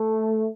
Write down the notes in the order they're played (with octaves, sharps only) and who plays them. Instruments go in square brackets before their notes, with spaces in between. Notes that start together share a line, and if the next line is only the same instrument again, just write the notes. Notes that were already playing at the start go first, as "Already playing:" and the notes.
Already playing: [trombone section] A3